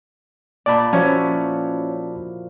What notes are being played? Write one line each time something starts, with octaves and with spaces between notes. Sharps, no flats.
A#2 D5 A5 B5
F3 C#4 E4 F#4